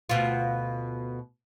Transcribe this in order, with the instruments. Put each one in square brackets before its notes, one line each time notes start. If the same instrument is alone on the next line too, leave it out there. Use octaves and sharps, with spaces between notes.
[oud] D2 B2 F4